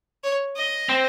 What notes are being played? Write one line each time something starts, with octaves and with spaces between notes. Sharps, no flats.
C#5
D#5
C4